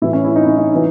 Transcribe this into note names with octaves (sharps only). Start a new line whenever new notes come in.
A2 E3 E4
C#4
E4
D#4
C#4
D#4
E3